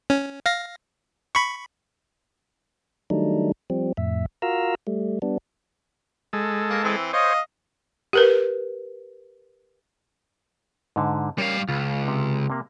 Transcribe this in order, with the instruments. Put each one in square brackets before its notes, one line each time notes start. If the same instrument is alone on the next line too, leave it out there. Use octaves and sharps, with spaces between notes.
[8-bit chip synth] C#4
F5 A#6
B5 C#6
[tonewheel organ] D#3 F#3 G3 A3 D4 D#4
F3 G3 C4
F2 A2 E5
F4 F#4 A#4 F5 A#5 E6
G3 A3
G3 B3 D4
[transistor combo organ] G#3 A4
[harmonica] A#3
E3 C4
[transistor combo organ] C5 C#5 [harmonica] D#5 F5 D#6
[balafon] G4 A#4 B4
[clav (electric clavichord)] G#2 D3
[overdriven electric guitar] G3 F5 [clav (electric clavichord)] C#4 A#4 C#5
[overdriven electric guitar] C#2 [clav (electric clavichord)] F4
[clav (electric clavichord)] C3
C3 A#3